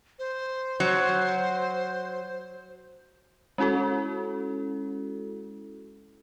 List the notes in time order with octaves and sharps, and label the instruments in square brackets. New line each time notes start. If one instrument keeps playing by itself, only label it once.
[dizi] C5
[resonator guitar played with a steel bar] F#3
[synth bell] G#3 C#4 E4 F#4 A4